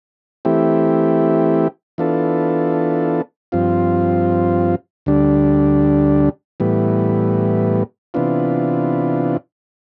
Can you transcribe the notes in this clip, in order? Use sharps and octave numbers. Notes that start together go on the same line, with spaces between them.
E3 A3 C4 E4 G4
E3 B3 D4 F4 A4
G2 F3 C4 F4
D2 D3 G3 D4
A2 E3 G3 B3
C3 E3 B3 D4 F4